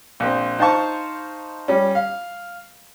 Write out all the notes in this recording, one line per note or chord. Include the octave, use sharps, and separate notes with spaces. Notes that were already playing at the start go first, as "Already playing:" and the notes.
A#1 C4
D#4 C5 F5 A5 C#6
G3 C#4
F5